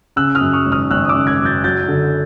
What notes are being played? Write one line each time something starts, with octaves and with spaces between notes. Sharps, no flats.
C#3 E6 F#6
D#6 F6
F#2
C#6 D#6
G#1
D#6 F6
G#1 E6 F#6
D#6
D6 E6
C#3
F#6 G#6
F#2
G6 A6
F#3 G6 A6
D3